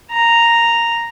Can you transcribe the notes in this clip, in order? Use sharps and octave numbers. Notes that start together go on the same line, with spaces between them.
A#5